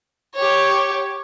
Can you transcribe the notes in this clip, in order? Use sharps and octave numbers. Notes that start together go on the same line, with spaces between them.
G4 C#5